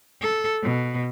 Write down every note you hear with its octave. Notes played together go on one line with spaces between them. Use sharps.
A4
B2